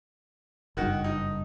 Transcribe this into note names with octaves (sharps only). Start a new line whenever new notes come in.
F#1 G2 D#3 F#4
D#4